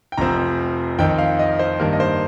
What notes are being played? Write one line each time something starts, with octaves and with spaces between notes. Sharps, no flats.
G5
F1 F2 F3 C4 A#5
F2 D#3 C4 D#4 G5
F5
D#5
C5
G2 D#3 G3 A#3 A#4
D#5
C5